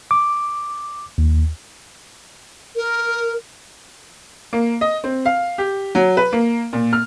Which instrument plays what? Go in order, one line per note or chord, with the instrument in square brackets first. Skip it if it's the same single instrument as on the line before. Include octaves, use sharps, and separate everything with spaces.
[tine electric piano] D6
D#2
[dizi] A#4
[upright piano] A#3
D#5
C4
F5
G4
F#3
B4
A#3
A#2
F6